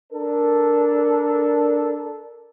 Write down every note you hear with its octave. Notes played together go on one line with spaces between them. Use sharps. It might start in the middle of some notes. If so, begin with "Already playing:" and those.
D4 A4 A#4